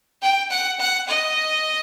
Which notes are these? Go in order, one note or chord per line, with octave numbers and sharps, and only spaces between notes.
G5
F#5
F#5
D#5